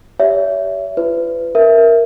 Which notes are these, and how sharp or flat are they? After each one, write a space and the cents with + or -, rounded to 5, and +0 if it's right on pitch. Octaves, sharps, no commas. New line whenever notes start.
G4 +5 C#5 +40 E5 +10
F4 -40 B4 +30
A#4 +0 E5 +0